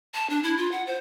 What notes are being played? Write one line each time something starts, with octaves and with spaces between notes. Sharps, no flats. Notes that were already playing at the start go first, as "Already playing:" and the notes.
A5
D4
E4
F4
F#5
C5